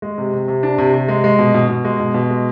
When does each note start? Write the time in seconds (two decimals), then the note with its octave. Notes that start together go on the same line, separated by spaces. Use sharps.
0.02 G#3
0.18 C3
0.33 C3
0.48 C3
0.63 D4
0.78 C3
0.94 C3
1.08 G#3
1.24 G#3
1.39 B2
1.54 B2
1.69 B2
1.85 G#3
2.00 B2
2.14 B2
2.30 G#3